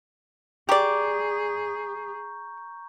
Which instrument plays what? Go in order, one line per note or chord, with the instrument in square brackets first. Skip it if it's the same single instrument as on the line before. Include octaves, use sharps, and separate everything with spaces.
[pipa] G4 D5 [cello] G#4 [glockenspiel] A#5 C#6 G6